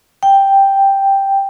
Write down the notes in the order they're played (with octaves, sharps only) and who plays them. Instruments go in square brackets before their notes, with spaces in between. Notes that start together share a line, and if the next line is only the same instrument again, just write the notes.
[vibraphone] G5